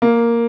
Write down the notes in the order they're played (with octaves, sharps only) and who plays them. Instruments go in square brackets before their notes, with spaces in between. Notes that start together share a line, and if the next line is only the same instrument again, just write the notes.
[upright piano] A#3